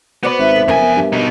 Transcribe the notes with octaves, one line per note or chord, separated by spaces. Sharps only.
B3 F#4 B4 C5 D5
G#1 E5
D4 A4
F#1 F2 B3 A#4 G#5
G2
B2 D#4